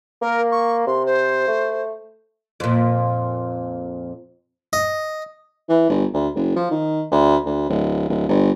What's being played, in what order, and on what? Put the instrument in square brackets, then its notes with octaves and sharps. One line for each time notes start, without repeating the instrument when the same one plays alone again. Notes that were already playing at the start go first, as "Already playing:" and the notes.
[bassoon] A#3 [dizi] A#4
[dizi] C#6
[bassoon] C3 [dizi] C6
[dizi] C5
[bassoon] A3
[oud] F2 A#2
[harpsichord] D#5
[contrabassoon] E3
G1
D2
F#1
F3
D#3
D2
D2
D1
D1
G1